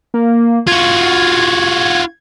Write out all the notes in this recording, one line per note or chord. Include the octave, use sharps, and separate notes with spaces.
A#3
F4 F#4 G#6